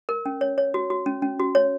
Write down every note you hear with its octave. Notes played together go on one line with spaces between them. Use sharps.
A#4
C#4
C#5
C#5
F#4
F#4
C#4
C#4
F#4
C#5